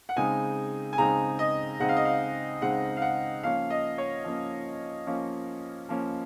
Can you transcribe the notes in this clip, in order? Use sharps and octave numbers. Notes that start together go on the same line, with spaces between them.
F#5
C#3 G#3 C4 D#4 G#5
G#5
C#3 G#3 C4 D#4 A#5
D#5
C#3 G#3 C4 D#4 F#5
F5
D#5
F5
C#3 G#3 C4 D#4 F#5
F5
F#5
F3 A#3 C#4 F5
D#5
C#5
F3 A#3 C#4
F3 A#3 C#4
F3 A#3 C#4